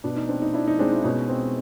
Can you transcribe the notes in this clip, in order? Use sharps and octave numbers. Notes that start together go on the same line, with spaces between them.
B2 D4
D#4
C4 D4
D#4
D4 E4
D#4
G#3 C4 D4
E4
B2 C#4 D#4
C4